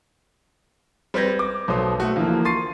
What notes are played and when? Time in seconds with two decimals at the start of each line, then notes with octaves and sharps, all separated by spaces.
1.14 G3 C4 B4 G6 G#6 A#6
1.39 D6
1.68 B1 B2 A4 C5 D#6
2.00 A3 F#4
2.16 D3 E3 F3 A#3
2.45 C6 C#6 A6 C7 D#7